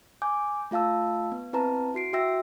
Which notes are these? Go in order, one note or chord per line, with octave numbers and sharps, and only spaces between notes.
G#5 D6 G6
A3 F4 F5 A5 E6
B3
C4 E4 B4 A5 A#5
E4 F#4 C7 D7
F#4 E5 G5 E6 A#6